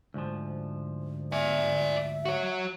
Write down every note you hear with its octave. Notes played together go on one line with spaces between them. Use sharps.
D2 G#2 F3
D5 E5 G#5
F#4 C#5